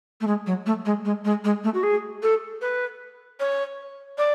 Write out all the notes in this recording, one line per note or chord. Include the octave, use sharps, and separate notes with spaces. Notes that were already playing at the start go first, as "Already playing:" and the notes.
A3
G#3
F#3
A3
G#3
G#3
G#3
G#3
A3
F#4
G#4
A4
B4
C#5
D5